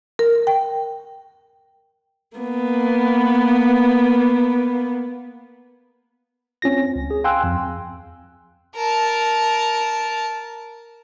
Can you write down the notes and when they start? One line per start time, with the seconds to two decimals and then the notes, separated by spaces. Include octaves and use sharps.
0.19 A#4
0.47 G5
2.37 A#3 B3
6.62 C4 C#4 F4 A#6
6.96 C#2
7.11 G#4
7.24 F5 G5 G#5 C6 E6 F#6
7.44 F2
8.76 A#4 A5